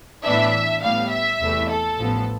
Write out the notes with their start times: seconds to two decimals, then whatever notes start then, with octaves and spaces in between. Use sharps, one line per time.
0.24 A2 E3 B3 D4 E5
0.82 A2 G3 B3 F5
1.11 E5
1.40 E2 C3 E3 A3
1.69 A4
1.97 A1 A2 F3 B3